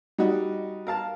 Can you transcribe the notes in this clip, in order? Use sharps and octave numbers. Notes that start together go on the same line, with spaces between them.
G3 D#4 F#4
A#4 F5 A5